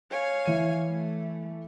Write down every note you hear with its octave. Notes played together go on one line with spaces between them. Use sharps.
C#5 F5 G#5
E3 D#7
A3